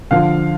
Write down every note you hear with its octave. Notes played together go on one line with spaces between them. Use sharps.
D3 F3 F5